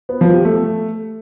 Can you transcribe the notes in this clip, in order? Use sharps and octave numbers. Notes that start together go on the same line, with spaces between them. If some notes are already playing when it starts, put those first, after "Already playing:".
B3
F3
G4
A3